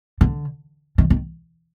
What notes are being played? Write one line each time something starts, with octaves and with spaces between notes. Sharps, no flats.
D3
D#3
D#3